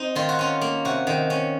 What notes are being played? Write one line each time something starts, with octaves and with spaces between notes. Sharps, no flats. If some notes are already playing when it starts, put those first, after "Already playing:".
Already playing: C4 D#4
D#3 F4
F#4
C#4 F4
A#3
C3 F#4
D#3
C#4